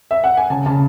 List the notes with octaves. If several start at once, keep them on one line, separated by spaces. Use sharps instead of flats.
E5
F#5
G#5
C#3 A5
C#3 A5